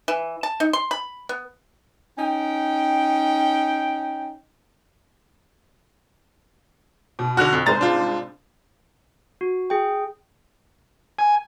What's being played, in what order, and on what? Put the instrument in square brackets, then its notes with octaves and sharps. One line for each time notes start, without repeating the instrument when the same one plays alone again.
[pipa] E3
A5
D#4
C6
B5
B3
[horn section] C#4 D#4 G5
[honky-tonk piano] B2
[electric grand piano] D3 F#4 [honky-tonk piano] F6 F#6 F7
[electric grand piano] F2
[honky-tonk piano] C2 G#2 C5 [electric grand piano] A#5 A6
[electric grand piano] D4 F4
[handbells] F#4
G#4 G5
[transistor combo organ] G#5